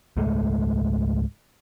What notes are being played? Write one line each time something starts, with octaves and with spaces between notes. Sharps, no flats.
C#2 G#2 G#3 A3